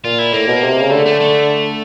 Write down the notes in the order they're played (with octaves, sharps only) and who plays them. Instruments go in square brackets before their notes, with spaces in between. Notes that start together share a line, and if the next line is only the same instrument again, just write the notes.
[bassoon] A#2 [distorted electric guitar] F4
[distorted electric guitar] E4
[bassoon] A2 [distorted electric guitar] A#3
[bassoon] B2
C3
C#3
[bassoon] D3 [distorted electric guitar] A3
[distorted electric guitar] A3
A3